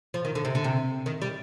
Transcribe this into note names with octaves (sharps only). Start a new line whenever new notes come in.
F3
D#3
D3
C3
D3
C3
D#3
G3